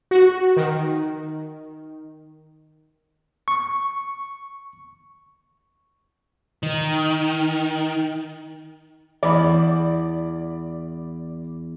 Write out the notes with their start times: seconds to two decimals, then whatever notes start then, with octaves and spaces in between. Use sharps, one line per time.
0.11 F#4
0.57 D#3
3.48 C#6
6.63 D#3
9.23 E2 D5 B5